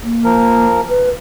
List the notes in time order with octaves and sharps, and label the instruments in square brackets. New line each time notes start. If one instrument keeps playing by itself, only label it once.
[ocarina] A#3
[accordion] F3 A#4
[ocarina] B4